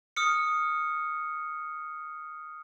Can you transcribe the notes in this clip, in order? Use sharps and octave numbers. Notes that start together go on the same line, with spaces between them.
D#6 F6 C#7